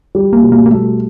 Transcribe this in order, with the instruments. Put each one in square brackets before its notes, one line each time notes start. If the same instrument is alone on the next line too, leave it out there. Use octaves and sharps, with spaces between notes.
[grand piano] G3
[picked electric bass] A#3
[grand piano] B2
[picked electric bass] A#3
A#3
[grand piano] G3 [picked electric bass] A3